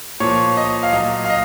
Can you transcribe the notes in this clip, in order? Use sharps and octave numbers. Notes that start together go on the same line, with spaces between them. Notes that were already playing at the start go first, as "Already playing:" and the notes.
A#2 F3 C#5
D#5
F5
A#2 F#3 D#5
F5
D#5